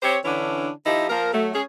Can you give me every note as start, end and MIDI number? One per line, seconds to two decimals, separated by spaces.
0.03 0.17 60
0.03 0.17 67
0.03 0.17 72
0.03 0.17 73
0.25 0.69 50
0.25 0.69 52
0.25 0.69 61
0.25 0.69 62
0.25 0.69 64
0.86 1.08 53
0.86 1.08 63
0.86 1.08 64
0.86 1.08 67
0.86 1.08 75
1.10 1.29 53
1.10 1.29 58
1.10 1.29 70
1.33 1.49 54
1.33 1.49 57
1.53 1.63 61
1.53 1.63 68